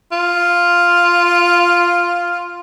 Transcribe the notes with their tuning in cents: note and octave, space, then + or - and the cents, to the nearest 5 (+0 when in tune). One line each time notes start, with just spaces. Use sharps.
F4 +0